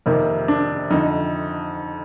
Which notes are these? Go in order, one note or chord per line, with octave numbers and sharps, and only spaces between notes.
F2 C3 D#3 A#3
D4
F2 D3 D#4